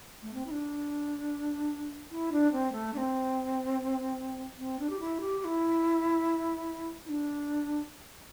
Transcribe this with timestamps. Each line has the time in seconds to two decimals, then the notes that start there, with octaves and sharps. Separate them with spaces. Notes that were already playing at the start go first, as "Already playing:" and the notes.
0.22 A3
0.34 C4
0.46 E4
0.51 D4
2.11 E4
2.32 D4
2.52 C4
2.72 A3
2.94 D4
2.97 C4
4.58 C4
4.79 D4
4.90 G4
5.00 E4
5.21 G4
5.40 G4
5.45 E4
7.06 E4
7.09 D4